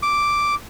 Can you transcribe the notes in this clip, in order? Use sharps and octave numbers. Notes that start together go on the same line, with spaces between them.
D6